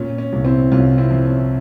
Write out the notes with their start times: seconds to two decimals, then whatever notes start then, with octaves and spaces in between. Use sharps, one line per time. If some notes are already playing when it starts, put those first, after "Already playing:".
Already playing: A#2 C#4
0.18 C#4
0.32 C2
0.45 C4 E4
0.71 C2 C#4 F4
0.98 C4 E4
1.11 F3
1.24 C#4